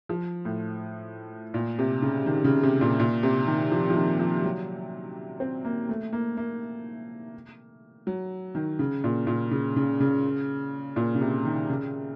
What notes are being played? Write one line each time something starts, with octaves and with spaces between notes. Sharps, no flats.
F3
A2
A#2
C3
C#3
D#3
C#3
C3
A#2
A#2
C3
D#3
F3
F3
D#3
F3
F#3
C4
A#3
A3
A#3
A#3
F#3
D#3
C#3
A#2
A#2
C#3
C#3
C#3
A#2
C#3
C3
D#3
C#3